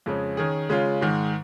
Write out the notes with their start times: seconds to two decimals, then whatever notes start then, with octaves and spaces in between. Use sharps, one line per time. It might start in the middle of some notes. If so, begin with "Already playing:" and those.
0.06 F2 C#3 G#3 C#4
0.37 D#3 C#4 G#4
0.69 C#3 G#3 C#4 F4
1.01 G#2 D#3 G#3